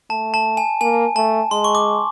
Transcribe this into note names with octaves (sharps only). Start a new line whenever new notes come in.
A3 A5
A5
G#5
A#3 G#5
A3 A5
G#3 C6
C#6
D6